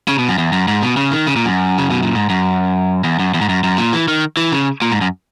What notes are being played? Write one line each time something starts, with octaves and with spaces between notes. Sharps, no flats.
C#3
B2
F#2
E2
F#2
G#2
B2
C#3
D#3
C#3
A#2
F#2
C#3
B2
A#2
G#2
F#2
E2
F#2
E2
G#2
F#2
F#2
A#2
E3
D#3
E3
C#3
A#2
G#2
F#2